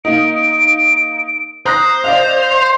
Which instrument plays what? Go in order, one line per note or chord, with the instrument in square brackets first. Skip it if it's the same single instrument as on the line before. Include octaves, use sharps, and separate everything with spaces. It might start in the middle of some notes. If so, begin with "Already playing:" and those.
[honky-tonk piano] A#3 D#4 [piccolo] D7
[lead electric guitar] C5 [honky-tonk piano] A#5 F#6 A#6 [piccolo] D#6
[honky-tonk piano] D5 D#5 F5 [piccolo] F7